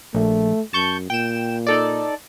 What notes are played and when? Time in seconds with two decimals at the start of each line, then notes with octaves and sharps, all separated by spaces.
0.14 A#1 A3
0.73 F#2 A5 C#6 G6
1.10 A#2 G5 E7
1.67 D#4 A4 D5